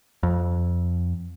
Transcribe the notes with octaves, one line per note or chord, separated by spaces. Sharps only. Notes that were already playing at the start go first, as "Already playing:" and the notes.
F2